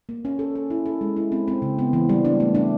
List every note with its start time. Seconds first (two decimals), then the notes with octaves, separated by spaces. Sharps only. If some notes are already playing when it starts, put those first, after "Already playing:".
0.09 A#3
0.25 C#4
0.39 A4
0.56 A4
0.70 E4
0.86 A4
1.01 G#3
1.16 E4
1.32 C4
1.48 C4
1.62 C#3
1.79 B3
1.93 E3
2.09 G3
2.25 D4
2.40 A3
2.55 D4